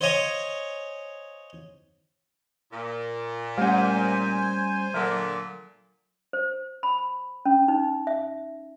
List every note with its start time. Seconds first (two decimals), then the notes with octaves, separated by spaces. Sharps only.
0.01 C5 C#5 D#5 F5 G#5
2.72 A#2
3.58 G3 A3 C#4 C5 F#5 G#5
4.94 A#2 D3 F#3
6.33 C5
6.83 B5
7.45 C#4
7.68 D#4
8.07 E5